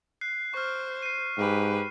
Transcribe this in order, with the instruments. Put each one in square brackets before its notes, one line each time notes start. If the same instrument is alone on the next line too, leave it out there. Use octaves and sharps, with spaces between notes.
[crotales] F#6 C7
[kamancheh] C5 [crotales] C#6 F6
[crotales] C7 D#7
[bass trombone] G#2 [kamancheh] G4 B4